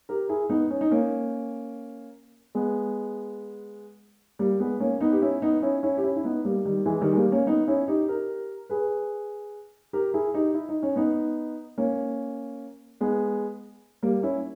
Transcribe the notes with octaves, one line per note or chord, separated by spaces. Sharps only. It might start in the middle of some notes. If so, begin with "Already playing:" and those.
G4 A#4
E4 G#4
B3 D#4
C#4
D#4
A#3 C#4
G#3 B3
G3 A#3
G#3 B3
A#3 C#4
B3 D#4
G4
C#4 E4
B3 D#4
C#4 E4
C#4 E4
G4
C#4 E4
E4
B3 D#4
G3 A#3
D#3 G3
E3 G#3
D#3 G3
G#3
G3 A#3
A#3 C#4
B3 D#4
C#4 E4
D#4 G4
G4 A#4
G#4 B4
G4 A#4
E4 G#4
D#4 G4
E4
D#4
C#4
B3 D#4
A#3 C#4
G#3 B3
G3 A#3
C#4 E4